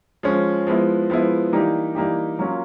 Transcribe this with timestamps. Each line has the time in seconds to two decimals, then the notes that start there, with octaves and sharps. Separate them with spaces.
0.23 F3 G#3 C#4
0.67 F3 G#3 B3 E4
1.10 F3 G#3 B3 E4
1.53 E3 G3 A#3 D#4 G4
1.95 E3 G3 A#3 D#4 G4
2.39 F#3 A#3 C#4 F4